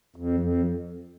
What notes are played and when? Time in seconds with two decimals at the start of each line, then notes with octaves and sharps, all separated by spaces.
0.16 F2
0.40 F2